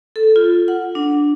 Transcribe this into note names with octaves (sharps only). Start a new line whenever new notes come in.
A4
F4
F#5
D4